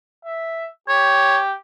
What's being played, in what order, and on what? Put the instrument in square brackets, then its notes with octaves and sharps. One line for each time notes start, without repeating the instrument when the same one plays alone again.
[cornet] E5
[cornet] G4 [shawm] C#5